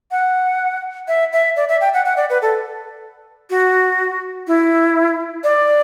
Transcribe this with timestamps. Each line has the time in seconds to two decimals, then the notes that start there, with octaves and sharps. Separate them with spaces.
0.11 F#5
1.08 E5
1.33 E5
1.56 D5
1.69 E5
1.81 G5
1.94 F#5
2.05 F#5
2.17 D5
2.30 B4
2.42 A4
3.50 F#4
4.47 E4
5.44 D5